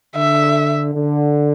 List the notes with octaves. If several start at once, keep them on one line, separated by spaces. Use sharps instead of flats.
D3 E5
D3